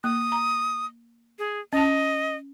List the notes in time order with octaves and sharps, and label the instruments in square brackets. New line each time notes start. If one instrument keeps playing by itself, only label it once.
[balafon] A#3 [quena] D#6
[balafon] A#5
[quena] G#4
[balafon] C#4 A5 [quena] D#5